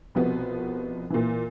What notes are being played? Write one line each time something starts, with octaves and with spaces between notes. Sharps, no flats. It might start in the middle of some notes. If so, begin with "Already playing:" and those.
C2 B2 F3 B3
A#2 E3